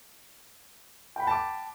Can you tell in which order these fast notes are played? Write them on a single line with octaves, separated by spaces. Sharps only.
G5 B5 F#5 A5 D6